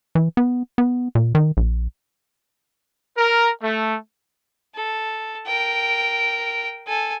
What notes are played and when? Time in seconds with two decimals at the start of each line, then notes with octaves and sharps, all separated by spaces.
0.15 E3
0.37 B3
0.78 B3
1.15 A#2
1.35 D#3
1.57 A#1
3.18 A#4
3.62 A3
4.75 A4
5.47 A#4 G5
6.87 A4 G#5